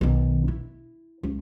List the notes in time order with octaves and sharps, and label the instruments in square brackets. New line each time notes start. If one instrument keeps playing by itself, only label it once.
[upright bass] B1 D#3
E4
C#2